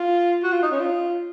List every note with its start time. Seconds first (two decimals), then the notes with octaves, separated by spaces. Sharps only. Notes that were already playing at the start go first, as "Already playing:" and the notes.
Already playing: F4
0.43 F#4
0.52 F4
0.62 D#4
0.72 C#4
0.80 F4